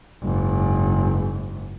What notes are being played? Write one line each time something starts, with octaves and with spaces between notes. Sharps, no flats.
F#1 G#2